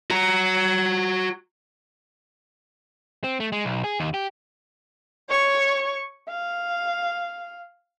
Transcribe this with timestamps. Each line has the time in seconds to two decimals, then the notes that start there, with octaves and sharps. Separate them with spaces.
0.10 F#4 A#5
3.24 C4
3.40 A3
3.52 G#3
3.65 B1
3.84 G#4
4.00 D#2
4.14 G4
5.29 C#5 C#6
6.29 F5